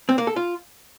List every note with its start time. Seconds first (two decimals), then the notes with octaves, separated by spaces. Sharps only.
0.09 C4
0.18 A#3
0.27 A4
0.36 F4